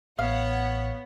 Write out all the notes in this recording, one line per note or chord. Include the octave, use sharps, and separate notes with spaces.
A1 B3 C#5 F5 F#5